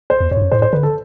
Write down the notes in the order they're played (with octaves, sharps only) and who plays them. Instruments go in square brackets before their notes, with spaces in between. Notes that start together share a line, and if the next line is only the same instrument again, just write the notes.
[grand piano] C5
[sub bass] E2
[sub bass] F2 [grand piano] C#5
[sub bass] G2
F#2
[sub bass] A2 [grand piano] C5
[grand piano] C5
[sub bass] D3 [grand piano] B4
[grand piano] A4